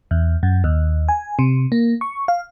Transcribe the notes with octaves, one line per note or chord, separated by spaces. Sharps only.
E2
F#2
D#2
G#5
C3
A#3
C#6
F5